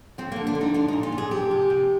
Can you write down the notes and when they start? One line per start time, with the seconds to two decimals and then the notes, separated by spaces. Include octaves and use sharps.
0.18 F3 C4
0.32 D3 A#3
0.47 D4
0.55 D3
0.61 D#4
0.74 F3 D4
0.88 A#2 D#4
1.03 F4
1.12 A#2
1.18 G#4
1.31 F3 G4
1.51 C3
1.70 C3